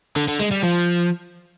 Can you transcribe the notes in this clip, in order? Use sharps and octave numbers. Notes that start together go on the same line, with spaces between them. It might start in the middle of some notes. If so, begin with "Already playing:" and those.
D3
D3
G#3
G3
F3